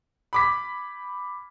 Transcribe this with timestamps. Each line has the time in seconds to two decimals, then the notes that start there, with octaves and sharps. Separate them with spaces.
0.33 B5 D6 B6